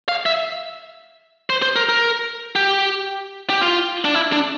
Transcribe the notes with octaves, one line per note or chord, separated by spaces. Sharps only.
F5
E5
C5
C5
A#4
A#4
G4
G4
F4
D4
E4
D4